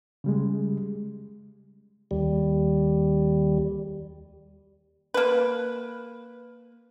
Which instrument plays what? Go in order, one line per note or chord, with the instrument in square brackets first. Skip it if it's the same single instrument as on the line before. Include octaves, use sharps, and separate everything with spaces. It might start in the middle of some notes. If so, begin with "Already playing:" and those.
[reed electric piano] C#3 G3 G#3
[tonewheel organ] D#2 G3
[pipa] A#3 B4